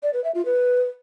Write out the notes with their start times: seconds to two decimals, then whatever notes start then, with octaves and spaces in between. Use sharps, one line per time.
0.03 D5
0.13 B4
0.24 E5
0.35 F4
0.45 B4